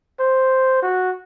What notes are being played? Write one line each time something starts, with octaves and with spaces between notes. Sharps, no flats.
C5
F#4